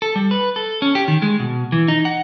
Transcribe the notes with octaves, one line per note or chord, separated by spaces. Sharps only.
A4
G3
B4
A4
C#4
G4
D#3
G#3
B2
E3
D#4
F#5